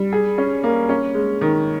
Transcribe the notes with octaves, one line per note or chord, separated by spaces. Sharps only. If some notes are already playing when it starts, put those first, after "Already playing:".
Already playing: G3
G#4
C#4
A#3
C#4
G#3
D#3